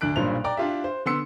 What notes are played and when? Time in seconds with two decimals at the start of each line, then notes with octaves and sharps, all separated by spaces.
0.01 D2 D4 F#6 D7
0.16 B1 G2 A#2 C5 F7
0.44 D5 G5 A#5 D6
0.57 D4 E4 F4 G4 E5
0.84 C5
1.06 D3 B3 C6 E6 C#7